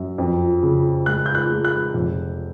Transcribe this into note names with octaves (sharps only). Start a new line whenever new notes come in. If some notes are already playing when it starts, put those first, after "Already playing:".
Already playing: F#2
F2
C#3
G#3 F#6
G6
F#6
G#3
F#6
F1